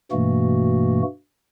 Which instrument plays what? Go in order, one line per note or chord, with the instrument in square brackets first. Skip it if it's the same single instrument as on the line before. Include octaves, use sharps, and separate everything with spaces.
[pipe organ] G2 B2 E3 A3 A#3 F#4